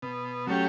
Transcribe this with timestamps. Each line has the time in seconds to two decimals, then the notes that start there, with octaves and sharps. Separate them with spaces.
0.02 B2
0.47 F#3 A3 C#4 G4